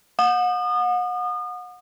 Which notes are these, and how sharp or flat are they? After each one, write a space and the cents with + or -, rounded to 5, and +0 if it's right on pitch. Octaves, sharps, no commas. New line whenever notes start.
F#5 -35 D#6 -35